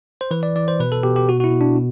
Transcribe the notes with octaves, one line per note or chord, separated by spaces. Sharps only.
C5
E3 B4
D5
E3 D5
C5
B2 B4
A4
B2 G4
G4
B2 F#4
F#4
E4
B2
D4
B2